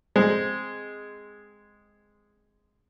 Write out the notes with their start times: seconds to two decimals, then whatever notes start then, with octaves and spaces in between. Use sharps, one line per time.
0.16 G#3 C4